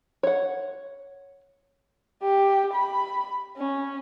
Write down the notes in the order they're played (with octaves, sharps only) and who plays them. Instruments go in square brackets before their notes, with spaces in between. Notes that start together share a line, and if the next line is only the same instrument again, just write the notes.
[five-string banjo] C#5 F#5
[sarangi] G4
B5
C#4